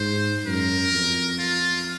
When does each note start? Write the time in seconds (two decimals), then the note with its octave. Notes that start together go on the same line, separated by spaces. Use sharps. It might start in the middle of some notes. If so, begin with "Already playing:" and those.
Already playing: G#2 C5
0.46 F#2 A#4
0.93 F2
1.39 F4